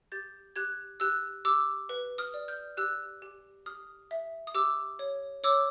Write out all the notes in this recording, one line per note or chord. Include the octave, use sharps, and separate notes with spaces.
G4 G6 A6
G4 F#6 G#6
G4 E6 F#6
G4 D6 E6
B4
D#6 F6
D5
F6 G6
G4 E6 F#6
G4
G4 D#6 F6
E5
D#6
G4 D6 E6
C#5
C#5 D6 E6